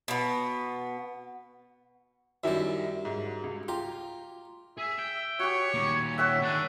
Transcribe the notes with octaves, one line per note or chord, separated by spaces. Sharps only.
B2 B3
F#2 D#3 G3 E4 E5
G#2
C#2
F4 G4 A#5
G#4 E5
G5
F#4 G4 C#5
A#2 D#3
C#5 E5 F#5 G5
D#3 D4 G#4